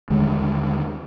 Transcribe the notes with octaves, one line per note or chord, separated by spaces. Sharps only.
D#2 D3 G3 G#3